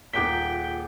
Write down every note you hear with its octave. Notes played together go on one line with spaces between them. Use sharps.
D#1 A#2 G#4 F#5 G5 D6 B6 G7